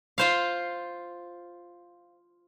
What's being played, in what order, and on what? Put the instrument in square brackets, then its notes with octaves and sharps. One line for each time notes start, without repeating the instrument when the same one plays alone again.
[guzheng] F4 C5 F5